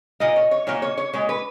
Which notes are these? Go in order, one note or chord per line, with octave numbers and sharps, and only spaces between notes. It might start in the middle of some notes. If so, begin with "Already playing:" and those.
A#2 A#3 D#5
C#5
C#5
A#2 A#3 C#5
C#5
C#5
A#2 G#3 C#5
B4